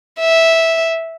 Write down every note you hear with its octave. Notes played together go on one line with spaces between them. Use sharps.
E5